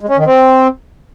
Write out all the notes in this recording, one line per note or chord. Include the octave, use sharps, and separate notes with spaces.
G#3
C#4
D#3
C4